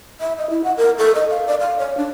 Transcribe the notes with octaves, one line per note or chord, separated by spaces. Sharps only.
E5
D#5
E4
F#5
A#4
A4
D#5
F5
D5
F5
C#5
D4